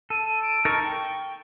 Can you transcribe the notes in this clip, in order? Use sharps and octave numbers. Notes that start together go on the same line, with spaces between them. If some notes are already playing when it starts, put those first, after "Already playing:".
A4 D#7
D7
D#4 A4 A#4 C#6
G5